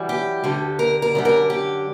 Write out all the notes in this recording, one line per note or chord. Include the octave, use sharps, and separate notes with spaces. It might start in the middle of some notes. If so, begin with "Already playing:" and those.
Already playing: F#2 E3 G3
G4
D2 D3 G3
A#4
A#4
F#2 D3 G3
A#4
G4